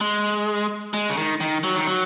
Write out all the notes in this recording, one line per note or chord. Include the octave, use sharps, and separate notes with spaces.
G#3
G#3
C#3
D#3
D#3
F#3
D#3
F#3